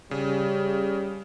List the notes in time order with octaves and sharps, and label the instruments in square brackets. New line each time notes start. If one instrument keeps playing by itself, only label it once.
[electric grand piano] C#3 [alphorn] G3